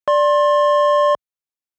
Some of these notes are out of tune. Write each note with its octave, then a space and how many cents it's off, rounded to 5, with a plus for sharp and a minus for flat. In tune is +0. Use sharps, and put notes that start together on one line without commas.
D5 +0 C6 +30